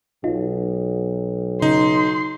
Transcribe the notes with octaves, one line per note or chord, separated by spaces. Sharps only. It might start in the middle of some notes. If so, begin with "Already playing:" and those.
B1 D#4 F4
C#3 D#4 C6